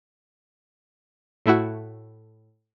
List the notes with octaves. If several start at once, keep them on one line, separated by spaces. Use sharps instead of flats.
A2 A3 E4 F#4